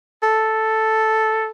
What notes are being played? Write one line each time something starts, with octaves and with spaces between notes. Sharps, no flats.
A4